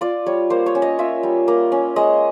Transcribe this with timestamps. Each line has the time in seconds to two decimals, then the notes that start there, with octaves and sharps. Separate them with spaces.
0.01 F4 D5
0.26 G3 C#5
0.50 A#3 C5
0.66 C#5
0.75 C#4
0.82 D#5
0.99 F4 E5
1.23 G3
1.48 A#3
1.72 C#4
1.96 G#3 D#5